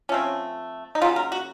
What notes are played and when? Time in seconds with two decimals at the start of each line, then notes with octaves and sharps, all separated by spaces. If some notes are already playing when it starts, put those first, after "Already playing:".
0.09 F3 A3 C4 C#4
0.95 D#4
1.01 C#3 F#3 A#3 F4
1.16 A#4
1.32 F#4